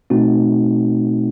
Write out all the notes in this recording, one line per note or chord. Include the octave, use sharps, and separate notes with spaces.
B2 A3 C4 D#4 F#4